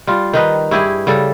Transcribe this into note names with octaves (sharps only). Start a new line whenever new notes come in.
G3 F4
D#3 D#4 B4
G2 E4 G4 G#4
C#3 G3 A4